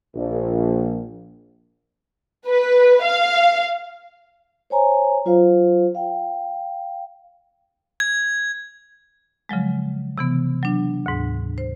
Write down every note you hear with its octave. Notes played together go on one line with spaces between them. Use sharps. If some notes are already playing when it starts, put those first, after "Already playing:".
A#1
B4
F5
C5 C#5 G#5 A#5
F#3 F4 C5 F5
F5 G5
G#6
C#3 F3 F#3 G#3
C3 E3 B3
F#3 D4
D2 G#2
C5